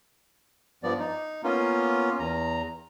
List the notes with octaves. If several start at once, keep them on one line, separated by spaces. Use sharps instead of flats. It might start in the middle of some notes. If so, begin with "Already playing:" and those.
G2 F3 B3 D5
D#4
A#3 B3 C#4 F4
E2 A#5